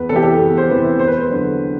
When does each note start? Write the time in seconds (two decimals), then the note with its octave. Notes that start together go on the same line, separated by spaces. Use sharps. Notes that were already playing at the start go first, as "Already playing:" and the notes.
Already playing: E2 B4
0.09 C3 A4
0.13 E3 G4
0.23 A4
0.39 E2
0.57 C5
0.69 C3 E3 B4
0.99 E2 C5
1.07 B4
1.16 C5
1.29 D3 F#3